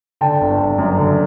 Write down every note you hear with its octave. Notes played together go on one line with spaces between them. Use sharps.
D3 G5 A5
G1
G1
F#2
D3